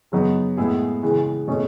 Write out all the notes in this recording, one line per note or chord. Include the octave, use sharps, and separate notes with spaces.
C#3 F#3 B3 D#4
A2 G#3 B3 E4 G#4
C#3 E3 G#3
B2 A3 C#4 G#4